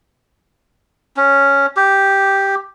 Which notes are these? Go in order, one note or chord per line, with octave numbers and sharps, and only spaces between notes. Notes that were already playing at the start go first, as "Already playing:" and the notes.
C#4
G4